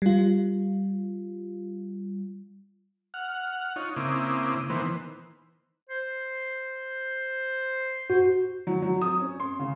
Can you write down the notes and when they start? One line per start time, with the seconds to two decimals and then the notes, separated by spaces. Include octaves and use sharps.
0.02 G3 F4
3.14 F#5 F6
3.76 D#4 F4 C#5
3.96 C#3 A#3 C4 E4 D6 D#6
4.70 D#3 E3 A#3 B3 C5
5.89 C5
8.10 F#4 C5
8.67 F#3
8.82 F#3
9.02 D#6
9.20 C#4
9.40 C6
9.59 C#3